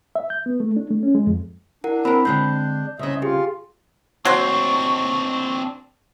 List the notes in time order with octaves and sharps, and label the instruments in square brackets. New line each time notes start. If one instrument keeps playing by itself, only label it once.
[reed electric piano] E5
G6
B3
A3
D4
A3
C#4
G#3
F2
[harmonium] D4 [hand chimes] E4 A#4 F#5
[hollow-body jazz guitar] C4 A#4 [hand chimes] B5
[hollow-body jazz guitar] D3 G#3 C4 [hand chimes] G6
[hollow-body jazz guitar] C2 C#3 [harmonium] D#5 E5
[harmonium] F4 [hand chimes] G4 G#4
[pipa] F#3 C5 [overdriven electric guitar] C4 D4 [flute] C#6